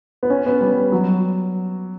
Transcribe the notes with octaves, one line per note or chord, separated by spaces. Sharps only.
B3
C#4
B3
G3
F#3